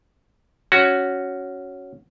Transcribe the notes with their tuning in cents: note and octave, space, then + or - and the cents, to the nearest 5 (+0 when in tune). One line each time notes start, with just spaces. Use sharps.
C#4 +0 F#4 +0